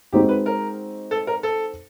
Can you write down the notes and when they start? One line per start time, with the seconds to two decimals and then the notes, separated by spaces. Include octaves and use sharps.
0.13 G#3 C4 D#4 F#4 G4
0.29 B4
0.46 A#4
1.11 A4
1.27 A#4
1.43 A4